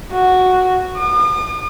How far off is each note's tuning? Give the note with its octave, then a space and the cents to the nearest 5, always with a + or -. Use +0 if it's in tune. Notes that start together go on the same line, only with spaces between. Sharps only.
F#4 -5
D#6 -45